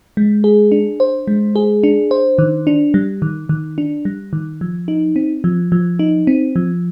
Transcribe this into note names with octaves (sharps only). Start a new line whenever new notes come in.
G#3
G#4
D4
C5
G#3
G#4
D4
C5
D#3
D4
G3
D#3
D#3
D4
G3
D#3
F3
D#4
C4
F3
F3
D#4
C4
F3